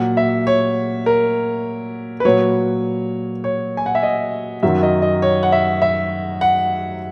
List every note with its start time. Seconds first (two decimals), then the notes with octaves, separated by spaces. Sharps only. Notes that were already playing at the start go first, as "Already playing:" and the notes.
Already playing: A#2 F#3 F#5
0.17 E5
0.47 C#5
1.06 A#4
2.20 B4
2.25 A#2 F#3 C#5
3.44 C#5
3.77 G#5
3.86 F#5
3.95 E5
4.03 D#5
4.63 F#2 D#3 F#3 E5
4.83 D#5
5.02 D#5
5.22 C#5
5.43 F#5
5.52 E5
5.82 E5
6.41 F#5